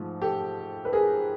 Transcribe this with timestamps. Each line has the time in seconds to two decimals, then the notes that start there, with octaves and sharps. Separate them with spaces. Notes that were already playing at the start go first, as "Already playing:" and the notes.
Already playing: G#2 F3 A3
0.21 G4 A4
0.85 B4
0.93 G#4 A#4